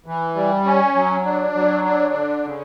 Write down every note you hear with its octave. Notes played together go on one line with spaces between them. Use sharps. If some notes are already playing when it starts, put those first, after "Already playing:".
E3
G3
C#4
F#3
D4
F#3
D4
D3
C#3